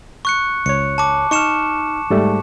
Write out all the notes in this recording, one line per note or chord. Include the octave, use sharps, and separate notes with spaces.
C#6 F#6 C#7
C#2 C#5 C#7
A5 D6
D#4 C#6 F6 C#7 E7
G#2 G3 A3